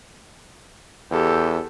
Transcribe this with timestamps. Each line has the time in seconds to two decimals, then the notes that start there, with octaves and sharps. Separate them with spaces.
1.11 E2 G4 A4